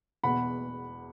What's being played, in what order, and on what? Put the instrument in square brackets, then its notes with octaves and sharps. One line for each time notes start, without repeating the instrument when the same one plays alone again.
[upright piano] E1 E2 B2 B3 F#5 B5